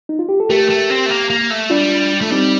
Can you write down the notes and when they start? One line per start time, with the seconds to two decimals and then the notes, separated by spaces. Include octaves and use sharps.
0.09 D#4
0.19 F4
0.29 G4
0.40 A4
0.50 A3 G4 A#4
0.70 A3
0.90 C4
1.06 A3
1.10 A#3
1.30 A#3
1.50 A3
1.70 G3 D4 F4
2.21 A3
2.30 G3 C4 D#4